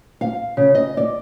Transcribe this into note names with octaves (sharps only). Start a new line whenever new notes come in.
F5
C#3
D#5
D5